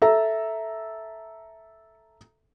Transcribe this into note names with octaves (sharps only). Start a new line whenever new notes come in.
A4 E5 A#5